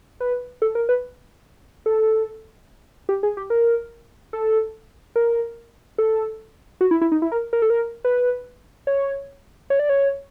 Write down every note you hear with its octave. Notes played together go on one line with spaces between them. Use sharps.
B4
A4
A#4
B4
A4
G4
G#4
G4
A#4
A4
A#4
A4
F#4
E4
E4
D#4
E4
A#4
A#4
A4
A#4
B4
C#5
C#5
D5
C#5